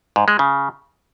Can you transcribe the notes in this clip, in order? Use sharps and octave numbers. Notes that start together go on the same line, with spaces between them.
G#2
G#3
C#3